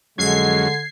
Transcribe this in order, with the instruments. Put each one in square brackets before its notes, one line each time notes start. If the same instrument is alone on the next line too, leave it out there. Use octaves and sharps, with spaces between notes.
[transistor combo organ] F2 F#3 C#4 [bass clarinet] D3 [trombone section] G#3 [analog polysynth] G#6 C7